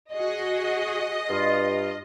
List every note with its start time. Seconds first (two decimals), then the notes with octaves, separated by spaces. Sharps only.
0.12 F#4 G#4 D#5
1.30 G2 F4